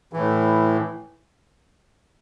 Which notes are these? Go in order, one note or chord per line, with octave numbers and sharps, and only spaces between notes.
A2 E3